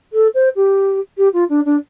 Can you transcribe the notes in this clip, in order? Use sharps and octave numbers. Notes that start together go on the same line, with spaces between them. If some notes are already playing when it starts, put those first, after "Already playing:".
A4
C5
G4
G4
F4
D4
D4